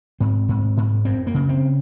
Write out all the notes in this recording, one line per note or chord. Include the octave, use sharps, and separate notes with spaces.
G#2 C4
G#2
G#2
F#2 C4
A#3
C#3
C4